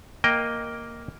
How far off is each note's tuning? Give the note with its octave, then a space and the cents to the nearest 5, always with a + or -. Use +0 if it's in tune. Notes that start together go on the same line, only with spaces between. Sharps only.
A#3 +0 D#5 +0 G5 +0